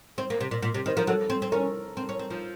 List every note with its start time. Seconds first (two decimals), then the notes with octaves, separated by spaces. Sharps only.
0.18 C4 C5
0.30 A#3
0.41 C3
0.51 A#2
0.62 A#2
0.74 C3
0.86 D#3 C5
0.97 F3 A#4
1.07 F#3 A4
1.30 C4
1.42 C4
1.52 C#4 A#4
1.97 C4
2.09 C#4
2.19 C4
2.30 F3